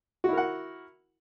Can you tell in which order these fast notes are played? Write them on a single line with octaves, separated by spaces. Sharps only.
F#4 E4 A#4 F#5